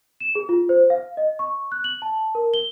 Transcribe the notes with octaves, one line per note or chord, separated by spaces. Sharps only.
E7
G#4
F4
C5
F5
D#5
C#6
F#6
F#7
A5
A#4
G7